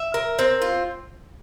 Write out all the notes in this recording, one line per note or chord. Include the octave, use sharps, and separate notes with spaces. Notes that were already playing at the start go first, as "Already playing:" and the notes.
Already playing: E5
A#4
C4
F4